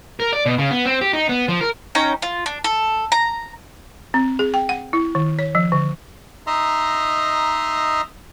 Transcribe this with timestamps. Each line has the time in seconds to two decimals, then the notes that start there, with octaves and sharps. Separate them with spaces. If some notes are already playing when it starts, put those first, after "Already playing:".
0.20 A#4
0.33 D5
0.46 B2
0.58 C#3
0.71 B3
0.85 C4
1.01 G4
1.13 D#4
1.29 B3
1.48 F3
1.61 A#4
1.95 C#4 D#4 G5 A#5
2.22 F4
2.46 D4
2.64 A4
3.12 A#5
4.14 C4
4.39 G#4
4.54 G5
4.69 F#5
4.93 E4
5.15 D#3
5.39 C#5
5.55 F3
5.72 D3
6.47 D#4 D#5 E5 A#5 C6